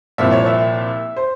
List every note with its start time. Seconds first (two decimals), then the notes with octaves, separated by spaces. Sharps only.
0.18 C2 A#2 F3 E5
0.32 C#5
0.46 E5
1.16 C5